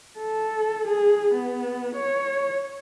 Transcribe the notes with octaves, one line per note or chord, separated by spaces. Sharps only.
A4
G#4
B3
C#5